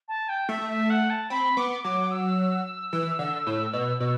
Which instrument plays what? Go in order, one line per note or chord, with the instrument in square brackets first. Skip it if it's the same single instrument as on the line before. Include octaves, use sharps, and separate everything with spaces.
[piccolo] A5
G5
[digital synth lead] A3 [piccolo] E5
[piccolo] E5
F#5
A5
[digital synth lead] C4 [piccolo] B5
[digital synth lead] B3 [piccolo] D6
[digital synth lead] F#3 [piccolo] D6
[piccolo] E6
[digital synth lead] E3
D3
A2
B2
B2